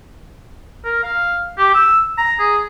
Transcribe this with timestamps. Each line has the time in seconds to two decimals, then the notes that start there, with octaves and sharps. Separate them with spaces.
0.84 A#4
1.03 F5
1.58 G4
1.75 E6
2.18 A#5
2.39 G#4